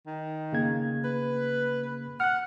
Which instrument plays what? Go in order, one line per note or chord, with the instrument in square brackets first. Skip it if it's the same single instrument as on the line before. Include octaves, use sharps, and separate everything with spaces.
[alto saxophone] D#3
[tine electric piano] C#3 A#3 G#6
[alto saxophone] B4
[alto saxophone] F#5 [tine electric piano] F6 F#6